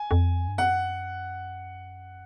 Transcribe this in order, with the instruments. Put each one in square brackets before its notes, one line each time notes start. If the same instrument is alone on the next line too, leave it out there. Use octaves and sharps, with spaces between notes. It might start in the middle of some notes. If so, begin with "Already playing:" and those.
Already playing: [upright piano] G#5
[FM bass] F2
G2
[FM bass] F#2 [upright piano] F#5